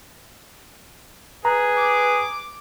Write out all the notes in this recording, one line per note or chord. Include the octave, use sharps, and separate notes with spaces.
G#4 B4 A#5
D6